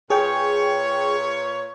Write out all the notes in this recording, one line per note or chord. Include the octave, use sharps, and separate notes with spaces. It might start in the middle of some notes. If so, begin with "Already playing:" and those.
A#2 G#4 B4 C#5 G5